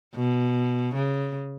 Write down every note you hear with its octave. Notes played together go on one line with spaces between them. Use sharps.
B2
C#3